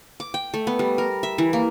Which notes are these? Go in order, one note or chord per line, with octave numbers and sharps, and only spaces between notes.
D6
G5
A3
B3
G3
A#4
E5
E3
A#3